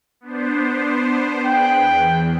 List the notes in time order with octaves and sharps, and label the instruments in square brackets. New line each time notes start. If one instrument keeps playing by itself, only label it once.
[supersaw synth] B3 D4 C5
[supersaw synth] G#4 B4 F#6 [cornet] G5
[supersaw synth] E2